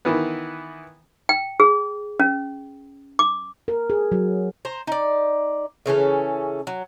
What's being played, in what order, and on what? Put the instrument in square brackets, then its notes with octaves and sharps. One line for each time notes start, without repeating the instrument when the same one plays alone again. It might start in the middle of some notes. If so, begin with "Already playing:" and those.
[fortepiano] D#3 E3 B3
[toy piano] G5
G#4
C#4
D6
[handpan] A#4
G#4
F#3
[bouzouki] C5 A#5
D#4 D5
C#3 E3 C#4 A4
F#3